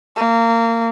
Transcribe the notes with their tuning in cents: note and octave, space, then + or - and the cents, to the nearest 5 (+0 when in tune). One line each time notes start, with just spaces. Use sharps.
A#3 -25